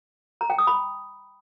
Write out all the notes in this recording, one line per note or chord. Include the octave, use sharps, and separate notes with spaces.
A#5
G5
D#6
B5